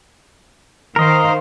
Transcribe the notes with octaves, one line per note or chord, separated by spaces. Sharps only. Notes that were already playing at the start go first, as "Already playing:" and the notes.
D#3 A#4 C5 D#5 F5